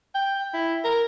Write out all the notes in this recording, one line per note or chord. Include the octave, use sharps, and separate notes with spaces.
G5
E4
A#4